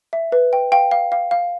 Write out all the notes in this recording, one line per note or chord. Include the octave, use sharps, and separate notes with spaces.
E5
B4
G5
F5 G5
F5
F5
F5